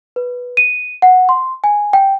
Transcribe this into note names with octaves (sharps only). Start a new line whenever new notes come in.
B4
D#7
F#5
C6
G#5
G5